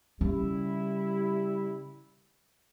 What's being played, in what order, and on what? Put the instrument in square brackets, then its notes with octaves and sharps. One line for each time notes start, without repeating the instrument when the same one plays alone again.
[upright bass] C#3 [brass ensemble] G3 E4